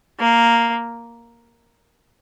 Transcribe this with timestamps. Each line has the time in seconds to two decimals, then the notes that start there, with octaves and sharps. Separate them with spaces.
0.20 A#3